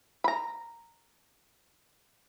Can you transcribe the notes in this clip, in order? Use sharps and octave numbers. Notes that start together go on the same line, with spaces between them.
A#5 B5